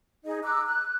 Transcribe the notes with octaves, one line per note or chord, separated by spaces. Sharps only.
D#4 G#4 D#5
A#5 D6 E6 F#6
F#6